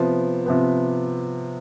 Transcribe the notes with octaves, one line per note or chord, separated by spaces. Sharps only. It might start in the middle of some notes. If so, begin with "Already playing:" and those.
Already playing: C3 F3 B3
C3 F3 B3